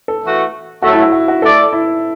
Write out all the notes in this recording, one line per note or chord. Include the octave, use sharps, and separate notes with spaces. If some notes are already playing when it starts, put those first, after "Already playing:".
A4
E3 A3 F#4
A2 F#3 A3 F#4
E4
F#4
F#4
F#4
A3 E4 A4 D5
E4